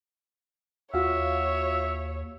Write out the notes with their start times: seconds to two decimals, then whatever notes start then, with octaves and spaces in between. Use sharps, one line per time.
0.94 D#2 F4 F#4 C#5 E5 F5